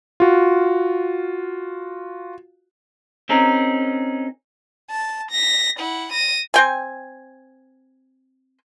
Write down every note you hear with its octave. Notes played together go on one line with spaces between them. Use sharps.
F4 F#4
C4 C#4 D#4 G#4 A#4
A5
A#6 B6
E4 F#5
A#6 D#7
C4 G5 G#5